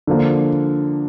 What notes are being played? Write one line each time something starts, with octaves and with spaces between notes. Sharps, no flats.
D3 F3 A#3